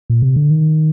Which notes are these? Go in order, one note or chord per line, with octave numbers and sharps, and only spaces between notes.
A#2
C3
D3
D#3